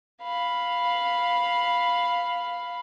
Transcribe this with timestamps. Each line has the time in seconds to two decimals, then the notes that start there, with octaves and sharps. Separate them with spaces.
0.22 F5 B5